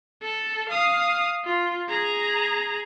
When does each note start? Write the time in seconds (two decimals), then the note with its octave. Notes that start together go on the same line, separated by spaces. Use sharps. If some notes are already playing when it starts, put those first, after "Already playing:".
0.22 A4
0.69 F5 D#6
1.45 F4
1.88 G#4 A#5